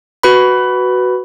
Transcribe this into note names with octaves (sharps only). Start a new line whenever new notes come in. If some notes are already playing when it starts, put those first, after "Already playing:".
F#4 B4 B5